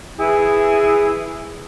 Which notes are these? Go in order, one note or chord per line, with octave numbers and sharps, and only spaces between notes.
E3 E4 G#4